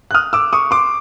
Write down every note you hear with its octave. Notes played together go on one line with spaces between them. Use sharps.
F#6
D#6 F6
D6 E6
C#6 D#6
C6 D6